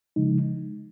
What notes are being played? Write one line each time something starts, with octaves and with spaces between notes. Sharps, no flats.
C#3 F3 G#3 D#4